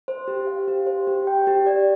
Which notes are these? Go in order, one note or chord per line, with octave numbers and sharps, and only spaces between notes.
C5
G4
F5
G4
C5
G4
G5
G4
D5